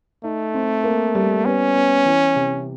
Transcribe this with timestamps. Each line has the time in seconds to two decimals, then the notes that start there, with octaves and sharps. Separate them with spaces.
0.23 A3 D#4
0.54 C4
0.84 A#3
1.15 G3
1.45 B3 C#4
1.75 B3
2.06 E3
2.36 C3